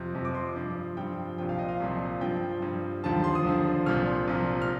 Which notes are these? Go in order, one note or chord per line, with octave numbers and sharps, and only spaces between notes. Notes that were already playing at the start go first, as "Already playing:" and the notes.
Already playing: F2 C3 F3
F2 C3 F3
D6
C6
G2 F3
G2 F3 G5
C2 A#2 F3 G5
F5
D#5
F5
C2 A#2 F3
G2 F3 G5
G2 F3
D#2 D3 F3 A5
C6
D#6
D#2 D3 F3
C2 A#2 F3 F6
C2 A#2 F3
F6